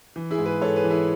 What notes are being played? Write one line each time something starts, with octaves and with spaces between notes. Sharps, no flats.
E3
E4 G#4
G#2
G#4 B4
G#2 A4 C#5
G#4 B4
E3
E4 G#4